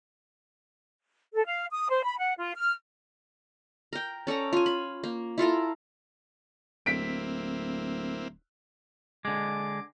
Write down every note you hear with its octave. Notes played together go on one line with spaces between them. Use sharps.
A4
F5
D#6
C5
B5
F#5
F4
F6
A#4 G5
C#4 A4 D5 A#5
F4 G#5
B5
A#3
E4 F4 A4 A#4
D1 A#3 C4 E4 B6 D7
D3 G#3 D6